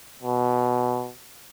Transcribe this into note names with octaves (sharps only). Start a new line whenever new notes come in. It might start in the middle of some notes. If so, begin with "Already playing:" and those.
B2